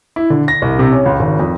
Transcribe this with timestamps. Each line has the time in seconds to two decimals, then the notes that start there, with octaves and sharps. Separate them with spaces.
0.16 E4
0.30 D3
0.48 A#6
0.62 C2
0.79 C3
0.92 C#4
1.06 C#2
1.19 G#1
1.40 F2